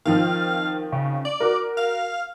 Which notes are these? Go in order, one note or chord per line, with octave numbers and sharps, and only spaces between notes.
D#3 F3 C4 F5
C#3
D5
F#4 A#4
F5